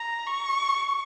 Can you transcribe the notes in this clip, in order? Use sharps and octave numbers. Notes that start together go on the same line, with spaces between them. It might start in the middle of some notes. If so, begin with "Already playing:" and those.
Already playing: A#5
C#6